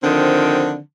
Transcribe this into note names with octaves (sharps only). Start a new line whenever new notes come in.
D3 D#3 F3 C4